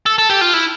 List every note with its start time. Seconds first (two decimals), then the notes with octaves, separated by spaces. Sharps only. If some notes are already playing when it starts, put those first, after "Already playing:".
0.06 A4
0.18 A4
0.29 G4
0.41 F4
0.54 E4